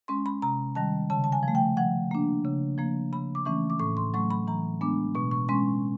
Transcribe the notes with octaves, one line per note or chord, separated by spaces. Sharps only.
G#3 C#4 C6
B5
C3 A#5
D#3 G3 A5
C#3 A5
A5
G#5
F3 A3
G5
F3 F#5
A#3 D4
C#3
F3 A#3
C#3 B5
D6
E3 A3 C#4 C#6
D6
A2 C#6
C6
F#3 A3 C#6
B5
E3 A#5
G#3 B3 D4 D6
B2 C#6
C#6
G#3 C#4 C6